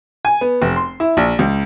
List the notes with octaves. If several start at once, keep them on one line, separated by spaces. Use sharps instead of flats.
G#5
B3
F1
C6
E4
A#1
C#2